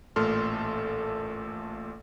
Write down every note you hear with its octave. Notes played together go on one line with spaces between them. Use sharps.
A1 A#2 A3 A4 C6 F6